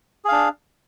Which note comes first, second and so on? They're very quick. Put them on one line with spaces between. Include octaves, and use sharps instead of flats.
G#4 F5 D4